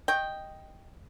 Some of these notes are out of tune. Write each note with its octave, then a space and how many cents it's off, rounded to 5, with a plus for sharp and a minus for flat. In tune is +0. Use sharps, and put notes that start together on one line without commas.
D#5 +0 G5 +0 C#6 -30